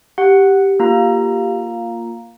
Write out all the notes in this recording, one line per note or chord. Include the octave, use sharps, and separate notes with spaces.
G4 F#5
A#3 F4 A#5